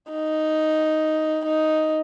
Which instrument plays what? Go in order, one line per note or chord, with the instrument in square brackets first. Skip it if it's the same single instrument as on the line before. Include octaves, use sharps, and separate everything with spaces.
[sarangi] D#4
D#4